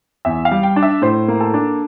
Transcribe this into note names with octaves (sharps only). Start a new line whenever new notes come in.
E2 E5
F5
G3
G5
D4
E5
A2 C5
A#3
A4
D4